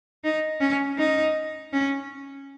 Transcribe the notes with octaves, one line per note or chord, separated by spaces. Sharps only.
D#4
C#4
D#4
C#4